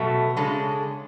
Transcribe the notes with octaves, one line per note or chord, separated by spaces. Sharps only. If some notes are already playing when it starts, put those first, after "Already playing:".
Already playing: B2 F#3 A3
C#3 G#3 D4 A4